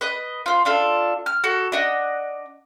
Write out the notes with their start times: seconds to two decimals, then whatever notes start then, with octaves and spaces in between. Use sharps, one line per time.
0.01 B4 D#5
0.46 F4 C5
0.65 D4 F4 A4
1.26 F6
1.44 F#4 A4
1.72 D4 D#5 F#5